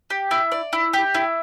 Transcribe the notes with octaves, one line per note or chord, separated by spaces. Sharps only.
G4
E4
D5
E4
G4
E4